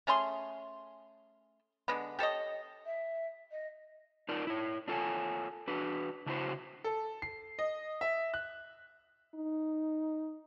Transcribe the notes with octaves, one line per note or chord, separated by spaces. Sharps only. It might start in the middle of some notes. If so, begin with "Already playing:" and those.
A3 C#4 G#4 C6
D3 G#3 B3
G4 A4 C#5 D#5
E5
D#5
D#4 F4 A#4 D5
E4 C#5
D4 F4 A4 A#4 C#5 G#5
D4 F#4 B4
C#3 D4 E4 F#4 C5
A4
C7
D#5
E5
F#6
D#4